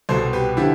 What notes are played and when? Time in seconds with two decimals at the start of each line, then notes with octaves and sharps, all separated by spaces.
0.09 C2 B2 A4 C5
0.33 G4 B4
0.57 D3 F3 E4 G4